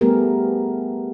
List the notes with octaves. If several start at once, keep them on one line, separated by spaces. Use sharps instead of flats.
G3 A3 B3 G4 G#4 A#4